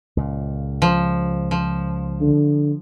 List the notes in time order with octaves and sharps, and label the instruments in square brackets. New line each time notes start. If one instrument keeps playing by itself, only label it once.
[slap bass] C#2 A#2
[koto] F3
F3
[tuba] D3